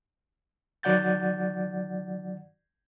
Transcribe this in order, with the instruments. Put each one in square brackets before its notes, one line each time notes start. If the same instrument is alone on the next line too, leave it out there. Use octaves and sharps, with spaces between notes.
[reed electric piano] D#3 F#3 D5 F#5 G6 A6